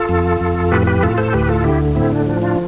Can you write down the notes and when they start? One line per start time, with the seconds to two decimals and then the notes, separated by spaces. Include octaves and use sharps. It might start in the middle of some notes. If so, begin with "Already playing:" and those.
Already playing: F4 A4
0.09 F2
0.41 F2
0.72 A2 G4 B4
0.87 G4 B4
1.03 A2 F4 A4
1.18 A4 C5
1.33 D2 G4 B4
1.49 F4 A4
1.64 D3 E4 G4
1.95 A2 C4 E4
2.12 D4
2.26 F3 D4
2.42 D4 F4